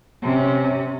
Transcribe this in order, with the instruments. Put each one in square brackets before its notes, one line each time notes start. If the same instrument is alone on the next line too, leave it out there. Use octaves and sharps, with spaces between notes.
[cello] C3 C#4